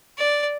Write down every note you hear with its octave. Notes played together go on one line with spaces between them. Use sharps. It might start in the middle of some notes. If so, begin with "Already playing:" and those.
D5